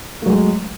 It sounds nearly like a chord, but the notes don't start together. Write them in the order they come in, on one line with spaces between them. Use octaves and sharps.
A3 F#3 G#3